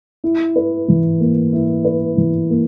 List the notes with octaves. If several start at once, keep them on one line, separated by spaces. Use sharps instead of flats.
E4
B4
E3
A#3
E4
B4
E3
A#3